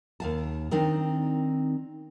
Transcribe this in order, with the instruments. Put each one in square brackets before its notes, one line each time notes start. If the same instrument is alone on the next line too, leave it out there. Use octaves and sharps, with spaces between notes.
[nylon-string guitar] D#2 F5 A5
D#3 C4 D4 D#4